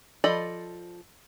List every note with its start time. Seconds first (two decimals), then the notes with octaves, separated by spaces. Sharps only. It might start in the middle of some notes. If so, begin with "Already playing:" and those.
0.24 F3 A4 D5 D#5 B5